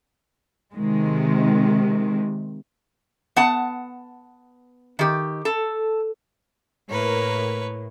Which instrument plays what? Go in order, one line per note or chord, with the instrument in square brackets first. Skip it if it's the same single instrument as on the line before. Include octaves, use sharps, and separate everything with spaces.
[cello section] C3 D#3 G#3
[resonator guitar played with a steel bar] B3 F#5 A5
D#3 G4
A4
[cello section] A2 [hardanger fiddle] A#3 A#4 [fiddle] B4 C#5